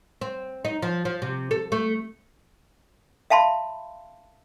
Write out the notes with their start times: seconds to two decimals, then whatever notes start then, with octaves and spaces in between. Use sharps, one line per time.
0.21 C4
0.65 D#4
0.82 F3
1.05 F3
1.22 C3
1.51 A4
1.72 A3
3.30 E5 F5 A5 B5 C6